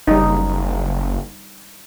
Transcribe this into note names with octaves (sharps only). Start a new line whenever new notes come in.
F#1 G3 D#4